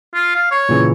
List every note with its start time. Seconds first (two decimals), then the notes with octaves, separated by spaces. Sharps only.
0.14 F4
0.35 F5
0.51 C#5
0.69 A#2 C#3 E3